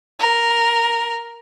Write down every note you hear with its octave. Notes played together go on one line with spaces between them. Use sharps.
A#4